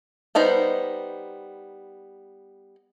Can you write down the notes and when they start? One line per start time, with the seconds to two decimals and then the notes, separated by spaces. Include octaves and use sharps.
0.35 G3 B3 D#4 C5